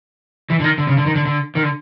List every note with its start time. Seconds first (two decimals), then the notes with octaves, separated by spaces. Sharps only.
0.50 E3
0.60 D3
0.64 D#3
0.78 D3
0.87 C#3
0.97 D3
1.06 D#3
1.15 D3
1.26 D3
1.55 D#3
1.63 D3